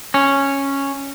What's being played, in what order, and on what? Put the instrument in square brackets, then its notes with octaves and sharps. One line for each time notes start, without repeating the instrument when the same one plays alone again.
[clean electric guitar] C#4